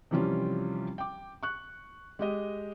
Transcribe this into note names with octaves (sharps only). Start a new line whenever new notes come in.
C3 E3 F3 G3 C#4 F4
G5 D6
C#6 F#6
G#3 G4 D#5